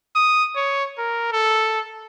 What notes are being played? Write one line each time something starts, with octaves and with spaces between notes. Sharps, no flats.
D#6
C#5
A#4
A4